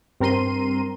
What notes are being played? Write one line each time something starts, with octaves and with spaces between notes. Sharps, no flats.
G2 C4 A#4 A#5 C6 D#7